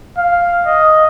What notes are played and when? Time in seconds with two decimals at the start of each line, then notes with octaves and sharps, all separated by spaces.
0.17 F5
0.66 D#5